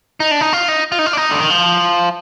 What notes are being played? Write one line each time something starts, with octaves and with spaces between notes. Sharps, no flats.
D#4
D4
D#4
F4
D#4
F4
D#4
F4
D4
D#4
D3
D#3
F3